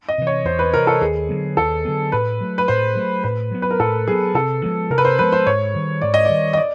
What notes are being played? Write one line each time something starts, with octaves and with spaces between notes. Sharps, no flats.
D#5
C3 E3
C#5
E2 C5
B4
C3 E3 A#4
A4
D#2 G#4
D3 F#3 B3
D#2 A4
D3 F#3 B3
A2 B4
F#3 A3
B4
A2 C5
F#3 A3
A2 B4
F#3 B3
B4
A#4
A2 A4
F#3 B3 G#4
C3 A4
F3 G#3 B3
C3 A#4
B4
C5
F3 G#3 B3 B4
C5
G#2 C#5
D#3 G3
G#2 D5
D#5
D5
D#3 G3
D#5
D5